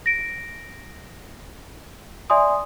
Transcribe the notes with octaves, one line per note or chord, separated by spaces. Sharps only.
A#6 D7
D5 E5 G#5 C6 D#6